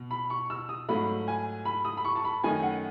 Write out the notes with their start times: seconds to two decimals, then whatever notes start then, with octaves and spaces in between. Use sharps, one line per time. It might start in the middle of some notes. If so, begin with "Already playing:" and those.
Already playing: B2
0.11 B5
0.30 C#6
0.50 E6
0.69 D#6
0.89 G#2 F#3 A3 B5
1.28 G#5
1.65 B5
1.85 D#6
1.97 B5
2.05 C#6
2.15 A5
2.24 B5
2.44 F#2 D#3 A3 D#4 G#5
2.62 F#5